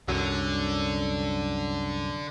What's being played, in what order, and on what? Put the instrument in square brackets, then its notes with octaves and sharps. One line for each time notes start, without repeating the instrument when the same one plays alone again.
[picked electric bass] C2 F#2 F#3 [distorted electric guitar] D3